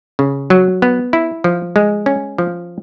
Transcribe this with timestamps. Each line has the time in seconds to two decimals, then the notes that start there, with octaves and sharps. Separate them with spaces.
0.19 C#3
0.50 F#3
0.82 B3
1.13 E4
1.44 F3
1.76 G#3
2.06 C#4
2.38 F3